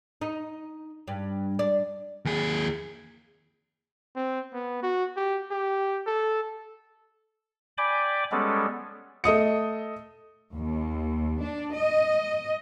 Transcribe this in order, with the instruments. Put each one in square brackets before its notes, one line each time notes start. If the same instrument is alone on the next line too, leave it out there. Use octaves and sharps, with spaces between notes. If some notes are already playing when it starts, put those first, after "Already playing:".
[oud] D#4
G2
D4
[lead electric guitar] D#2 G#4
[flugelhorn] C4
B3
F#4
G4
G4
A4
[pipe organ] D5 G5 G#5 B5 D6
G3 G#3 B3 C#4 A4
[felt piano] A3 D#5 D#6 C#7
[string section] D#2
D4
D#5